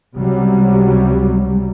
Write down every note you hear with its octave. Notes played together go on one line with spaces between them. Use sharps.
C#2 C3 F#3 G3